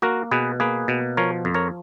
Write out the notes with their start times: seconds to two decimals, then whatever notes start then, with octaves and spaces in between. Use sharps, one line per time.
0.02 A#3 F#4 A#4
0.31 B2 G#4 B4
0.60 A#3 G#4 B4
0.88 B2
1.17 F3 A#4 C#5
1.45 F2
1.54 A#4 C#5